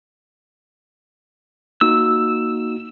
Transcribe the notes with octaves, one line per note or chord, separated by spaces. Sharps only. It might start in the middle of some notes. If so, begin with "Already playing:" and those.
A#3 D#4 F#4 E6